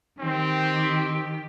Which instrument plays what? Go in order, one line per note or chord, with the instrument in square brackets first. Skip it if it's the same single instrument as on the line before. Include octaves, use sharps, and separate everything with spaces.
[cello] D#3 G4 [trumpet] C4